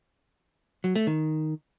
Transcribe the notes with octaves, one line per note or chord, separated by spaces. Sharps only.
F#3
A3
D#3